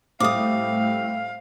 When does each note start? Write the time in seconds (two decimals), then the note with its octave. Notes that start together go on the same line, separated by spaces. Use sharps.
0.20 A2 G3 A3 C4 F5 D6 D#6